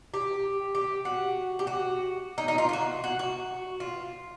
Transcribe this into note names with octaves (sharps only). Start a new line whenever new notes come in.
G4
G4
F#4
G4
F#4
D#4
D#4
F4
F4
F#4
F#4
F#4
F4